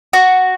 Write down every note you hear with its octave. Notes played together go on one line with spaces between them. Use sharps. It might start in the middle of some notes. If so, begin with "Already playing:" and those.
F#4